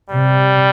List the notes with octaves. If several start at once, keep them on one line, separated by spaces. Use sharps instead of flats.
C3 G3